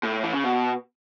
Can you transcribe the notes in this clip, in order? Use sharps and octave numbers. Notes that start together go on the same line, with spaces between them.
A2
E3
C#3
B2